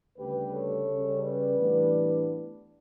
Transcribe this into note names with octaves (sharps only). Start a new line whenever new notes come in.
D2 C#3 G3 G4 B4
A4 C#5
C#3 G3 C#4
B4 D5
A2 E3 G3 B3 D4